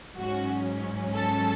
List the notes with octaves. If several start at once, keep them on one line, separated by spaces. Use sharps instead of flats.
G#2 F#3 C#4 F#4
A4